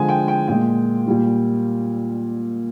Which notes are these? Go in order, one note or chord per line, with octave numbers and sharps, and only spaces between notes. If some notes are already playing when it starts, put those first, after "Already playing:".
Already playing: D3 F3 G#3 G#5
G5
G5
A#2 G#3 G5
A#2 G3